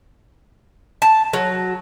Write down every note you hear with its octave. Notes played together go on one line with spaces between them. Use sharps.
A5
F#3